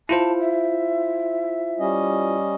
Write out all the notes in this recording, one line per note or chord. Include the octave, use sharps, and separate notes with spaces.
E4 F4 C5 A5
E5
G3 C#4 D#5